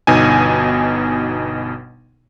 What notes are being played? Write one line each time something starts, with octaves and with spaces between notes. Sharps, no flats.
G1 B2 D#4 G#5